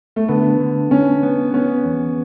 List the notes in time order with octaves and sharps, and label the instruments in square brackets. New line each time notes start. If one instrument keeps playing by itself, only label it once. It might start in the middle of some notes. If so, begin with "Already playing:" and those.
[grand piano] A3
[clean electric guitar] D3 [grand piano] B3
[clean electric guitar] D3
[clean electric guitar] D3 [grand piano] C#4
[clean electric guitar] B3
[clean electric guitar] B3 [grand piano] C#4
[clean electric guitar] E2